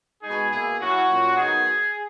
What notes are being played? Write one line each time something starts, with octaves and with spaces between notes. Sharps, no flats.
B2 G#3 D#4 G#4
B2 A#3 E4 G#4
F#3 C#4 E4 F#4
A#2 F#3 C#4
D#3 F#3 B3 D#4 G#4